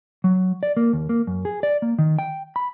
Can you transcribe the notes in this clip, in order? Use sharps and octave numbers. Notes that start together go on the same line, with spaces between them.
F#3
D5
A#3
D#2
A#3
F#2
G#4
D5
A#3
D#3
G5
B5